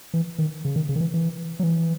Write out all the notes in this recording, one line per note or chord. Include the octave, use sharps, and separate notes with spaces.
E3
D#3
C#3
D#3
C#3
D#3
E3
E3
F#3
E3